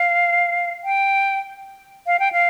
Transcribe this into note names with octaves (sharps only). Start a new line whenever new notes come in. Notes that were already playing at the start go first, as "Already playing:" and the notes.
Already playing: F5
G5
F5
G5
F5